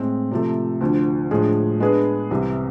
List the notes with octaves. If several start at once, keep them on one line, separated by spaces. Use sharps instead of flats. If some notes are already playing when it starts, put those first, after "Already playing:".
Already playing: A2 G#3 C4
C3 F3 A3
D2 D3 F3
A2 F3 G#3 D4 G#4
G#3 B3 D4 G#4 B4
C2 C3 E3